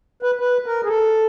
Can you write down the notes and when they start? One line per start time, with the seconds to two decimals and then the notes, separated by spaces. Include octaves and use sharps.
0.23 B4
0.40 B4
0.66 A#4
0.84 G#4
0.88 A4